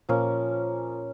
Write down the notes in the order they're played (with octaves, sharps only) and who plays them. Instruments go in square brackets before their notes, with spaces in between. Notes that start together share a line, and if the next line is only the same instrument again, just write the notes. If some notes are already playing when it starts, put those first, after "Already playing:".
[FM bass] A#2 [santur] F3 A#3 C#4